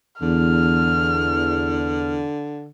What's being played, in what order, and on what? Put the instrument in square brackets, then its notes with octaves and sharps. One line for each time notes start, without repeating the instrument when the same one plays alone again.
[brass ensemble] E2 [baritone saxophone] D3 [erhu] F6